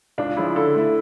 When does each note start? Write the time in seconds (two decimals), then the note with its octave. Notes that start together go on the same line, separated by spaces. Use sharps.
0.18 C#2 D4
0.37 C#3 F3 E4
0.56 D3 A4
0.75 A3 E4